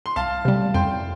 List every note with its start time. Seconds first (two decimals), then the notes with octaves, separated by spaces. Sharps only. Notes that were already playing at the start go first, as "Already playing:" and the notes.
0.06 C6
0.16 C2 F5 A5
0.45 C3 G3
0.74 F2 G5 C6